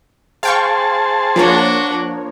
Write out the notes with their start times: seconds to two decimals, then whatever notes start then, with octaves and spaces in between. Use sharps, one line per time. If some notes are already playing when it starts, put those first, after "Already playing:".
0.43 G#4 C5 F5 G5 A5 C#6
1.36 F3 A#3 D4 F#4 C#5